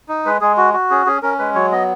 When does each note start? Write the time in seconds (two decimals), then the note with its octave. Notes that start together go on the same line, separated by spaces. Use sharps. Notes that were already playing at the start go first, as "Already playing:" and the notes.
0.09 D#4
0.25 G#3 B4
0.41 G#3 G#4
0.57 F#4
0.74 F#4
0.90 C#4 G#4
1.06 C#4 G#4
1.22 C#4 A#4
1.39 G#3 B4
1.55 F#3 C#5
1.72 B3 D#5